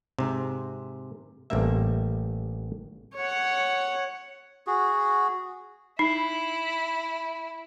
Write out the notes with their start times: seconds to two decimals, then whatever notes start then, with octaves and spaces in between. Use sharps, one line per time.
0.19 G#2 C3
1.50 A1 C3 G3 A#3 E5
3.16 C#5 F#5
4.67 F#4 G#4
5.99 D#4 E4